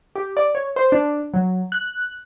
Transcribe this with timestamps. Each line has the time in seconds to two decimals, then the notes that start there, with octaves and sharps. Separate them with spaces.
0.15 G4
0.37 D5
0.55 C#5
0.76 C5
0.92 D4
1.34 F#3
1.72 F#6